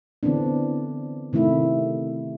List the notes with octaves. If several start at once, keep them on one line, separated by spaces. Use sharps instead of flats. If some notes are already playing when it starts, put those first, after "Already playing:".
D3 E3 B3 C4 D4
C3 D#3 A3 E4